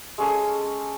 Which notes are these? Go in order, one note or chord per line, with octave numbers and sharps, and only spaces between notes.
G#3 C#4 G#4 A4